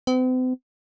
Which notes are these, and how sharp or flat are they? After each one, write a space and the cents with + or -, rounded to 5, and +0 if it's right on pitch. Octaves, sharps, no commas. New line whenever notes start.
C4 -45